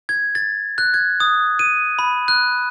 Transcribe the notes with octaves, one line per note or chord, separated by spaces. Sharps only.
G#6
A6
F#6
G#6
D#6
D#7
B5
F#6